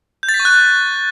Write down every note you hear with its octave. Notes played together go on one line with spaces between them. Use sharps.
G6
A6
B6
C#6
F#6